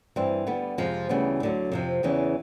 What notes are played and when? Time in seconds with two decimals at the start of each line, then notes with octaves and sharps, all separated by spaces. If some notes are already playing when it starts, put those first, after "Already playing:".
0.16 G2 E3 G3 C4
0.47 D3 G3 B3
0.78 F2 C3 F3 G#3
1.09 D2 C#3 E3 G3 B3
1.40 D2 D3 F#3
1.72 F2 C3 F3
2.03 E2 C#3 E3